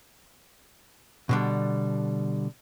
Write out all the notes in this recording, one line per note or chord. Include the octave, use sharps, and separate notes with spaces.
B2 D3 G3